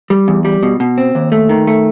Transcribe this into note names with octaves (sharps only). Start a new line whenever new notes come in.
G3
E2
G3
B2
B2
C4
D#2
A3
D#3
A3